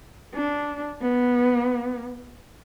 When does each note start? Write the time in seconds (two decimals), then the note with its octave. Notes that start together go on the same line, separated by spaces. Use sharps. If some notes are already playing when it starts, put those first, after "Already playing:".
0.34 D4
1.02 B3